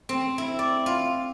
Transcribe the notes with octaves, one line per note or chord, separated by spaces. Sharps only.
C4
E4
D5
F4